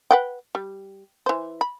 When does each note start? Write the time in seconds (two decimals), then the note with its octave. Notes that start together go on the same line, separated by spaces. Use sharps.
0.11 B4 F#5 G5
0.55 G3
1.26 E3 C5
1.61 B5